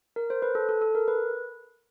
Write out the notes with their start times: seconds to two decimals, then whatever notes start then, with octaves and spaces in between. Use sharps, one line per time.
0.16 A#4
0.30 C5
0.42 B4
0.55 A4
0.69 A4
0.81 A4
0.95 A#4
1.08 B4